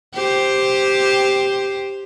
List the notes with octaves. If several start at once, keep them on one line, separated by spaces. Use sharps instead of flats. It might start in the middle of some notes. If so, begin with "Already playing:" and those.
G4 C5